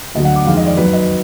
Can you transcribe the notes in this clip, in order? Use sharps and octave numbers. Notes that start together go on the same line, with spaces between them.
D2 D3 F#3 D#5
F#5
D6
F2 D#3 G#3 F5
D#5
D5
F#2 D#3 F#3 B4
D#5